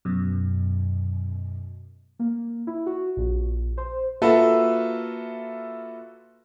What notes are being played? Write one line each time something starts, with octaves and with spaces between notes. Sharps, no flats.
F#2 B2
A#3
E4
F#4
A#1
C5
A#3 F4 F#4 A4 B4 E5